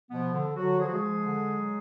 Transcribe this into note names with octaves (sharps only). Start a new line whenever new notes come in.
B2 F3 B3
D3
D3 F#3 F#4
F3 G#4
F#4
G#3 G#4
F3
D3
F#3